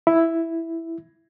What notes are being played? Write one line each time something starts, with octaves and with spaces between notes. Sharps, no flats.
E4